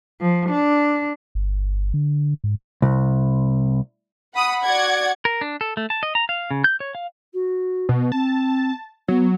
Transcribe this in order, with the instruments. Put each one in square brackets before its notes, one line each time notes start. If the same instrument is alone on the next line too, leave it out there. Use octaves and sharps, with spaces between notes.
[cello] F3
D4
[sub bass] G1
D3
G#2
[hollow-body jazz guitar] C2
[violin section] F#5 B5 D#6
F#4 D5 F#5 G#6
[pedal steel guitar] A#4
D4
A4
A3
A5
D#5
A#5
F5
C#3
G6
C#5
F5
[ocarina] F#4
[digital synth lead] B2
[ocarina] C4 [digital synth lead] A5
[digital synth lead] F#3 [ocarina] B3